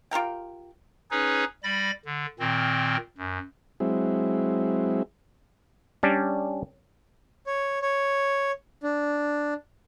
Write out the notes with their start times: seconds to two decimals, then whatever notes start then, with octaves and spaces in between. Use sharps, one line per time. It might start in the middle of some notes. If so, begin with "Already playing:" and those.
0.11 F4 G4 A#4 G5
1.11 C#4 D#4 G#4 B4 C#5
1.63 G3 D5 B5 A#6
2.05 D3
2.40 A#2 D#3 C4
3.18 F#2
3.80 F#3 G#3 C4 E4
6.03 G3 C#4 D4
7.46 C#5
7.82 C#5
8.83 D4